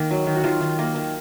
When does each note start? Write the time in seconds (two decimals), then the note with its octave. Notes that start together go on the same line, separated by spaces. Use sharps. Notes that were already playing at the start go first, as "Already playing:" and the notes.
Already playing: D#3 A#3
0.11 F#3
0.27 D#3
0.36 F#4
0.44 D#3 F4
0.61 D#3
0.79 A#3
0.96 D#3